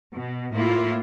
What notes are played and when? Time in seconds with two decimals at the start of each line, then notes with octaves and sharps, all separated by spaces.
0.15 B2
0.54 A2 A#3 E4 F4